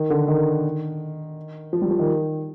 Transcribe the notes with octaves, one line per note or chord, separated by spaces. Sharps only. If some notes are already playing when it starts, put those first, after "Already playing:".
Already playing: D#3
D3
D#3
F3
G3
F3
D#3